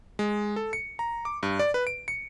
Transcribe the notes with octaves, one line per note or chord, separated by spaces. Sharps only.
G#3
A4
C#7
A#5
D6
G2
D5
B4
D7
C#7